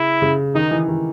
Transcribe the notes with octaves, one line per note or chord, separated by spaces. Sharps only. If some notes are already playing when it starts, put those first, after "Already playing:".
Already playing: C#3 E4
C#3
D#3 D#4
E3
D#3